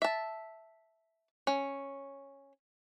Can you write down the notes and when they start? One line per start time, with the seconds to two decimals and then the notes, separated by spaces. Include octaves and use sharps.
0.02 E5 A5
1.47 C#4